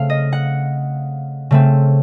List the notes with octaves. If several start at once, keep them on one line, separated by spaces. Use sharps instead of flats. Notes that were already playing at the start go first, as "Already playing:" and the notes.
Already playing: C#3 A3 C4 F5
D#5
F#5
C#3 A3 C4